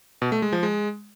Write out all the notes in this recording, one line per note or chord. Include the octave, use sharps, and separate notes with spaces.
B2
A3
G#3
F3
G#3